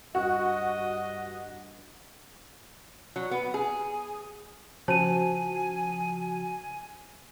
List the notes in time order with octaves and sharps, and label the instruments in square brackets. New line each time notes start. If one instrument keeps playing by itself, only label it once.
[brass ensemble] G2 D#5 [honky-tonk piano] F#4
[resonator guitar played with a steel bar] F#3
B3
G#4
[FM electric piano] C#3 F3 F#4 [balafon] C5 [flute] G#5 [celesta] A5 D#7